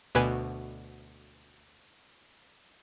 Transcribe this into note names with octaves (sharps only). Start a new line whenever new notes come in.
D2 B2 B4 G#5